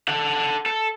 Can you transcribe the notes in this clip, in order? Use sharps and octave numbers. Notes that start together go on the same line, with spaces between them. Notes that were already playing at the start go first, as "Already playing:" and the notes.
A4 F#5
A4